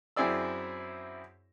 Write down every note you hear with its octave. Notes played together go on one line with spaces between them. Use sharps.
F#2 C4 E4 G#4 D5 E6